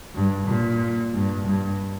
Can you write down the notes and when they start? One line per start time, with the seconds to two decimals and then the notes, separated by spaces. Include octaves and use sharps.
0.15 G2
0.48 A#2
1.13 G2
1.46 G2